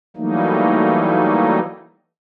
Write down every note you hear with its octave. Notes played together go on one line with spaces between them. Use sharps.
E3 F#3 G3 A3 A#3 D#4